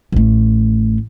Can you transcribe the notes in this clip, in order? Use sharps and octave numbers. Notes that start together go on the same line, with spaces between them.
A1 A3